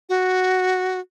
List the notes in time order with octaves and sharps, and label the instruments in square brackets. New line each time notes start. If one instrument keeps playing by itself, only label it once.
[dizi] F#4